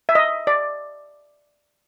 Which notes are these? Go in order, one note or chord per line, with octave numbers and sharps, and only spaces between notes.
E5
D#5
D5